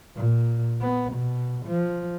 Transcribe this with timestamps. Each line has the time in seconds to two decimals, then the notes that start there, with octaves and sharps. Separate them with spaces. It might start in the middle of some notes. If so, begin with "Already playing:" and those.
0.16 A#2
0.81 B3
1.13 B2
1.67 F3